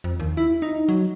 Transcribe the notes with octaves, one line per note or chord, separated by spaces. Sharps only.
F2
D#2
E4
D#4
F#3